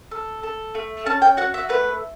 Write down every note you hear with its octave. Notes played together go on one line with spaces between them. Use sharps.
A4
A4
A3
C#4 A5
G5
F#4 F#5
E5
A3 B4